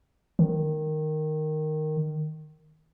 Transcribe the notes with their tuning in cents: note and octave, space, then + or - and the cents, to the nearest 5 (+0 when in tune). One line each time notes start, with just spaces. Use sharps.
D#3 -10